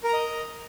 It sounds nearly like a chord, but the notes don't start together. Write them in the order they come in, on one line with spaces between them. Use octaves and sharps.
A#4 A#5 D#5